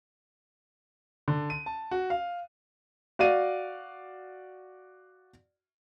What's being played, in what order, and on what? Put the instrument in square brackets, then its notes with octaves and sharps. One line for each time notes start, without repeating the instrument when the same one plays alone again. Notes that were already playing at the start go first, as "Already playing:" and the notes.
[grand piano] D3
D#7
A5
F#4
F5
[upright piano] F#4 D5 F5 D#7